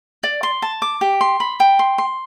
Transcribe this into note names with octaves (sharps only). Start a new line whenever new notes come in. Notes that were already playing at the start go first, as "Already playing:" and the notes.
D5
C6
A5
D6
G4
C6
B5
G5
C6
C6